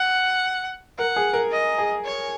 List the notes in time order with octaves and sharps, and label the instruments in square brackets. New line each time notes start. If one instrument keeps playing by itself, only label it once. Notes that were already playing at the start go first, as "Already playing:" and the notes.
Already playing: [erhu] F#5
[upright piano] A#4 [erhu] F#5
[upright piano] G#4
A#4
[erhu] D#5
[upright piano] G#4
[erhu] C#5